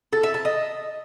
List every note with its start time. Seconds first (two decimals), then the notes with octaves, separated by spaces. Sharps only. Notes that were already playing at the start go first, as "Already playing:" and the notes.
0.13 A4
0.23 E5
0.34 A5
0.45 D#5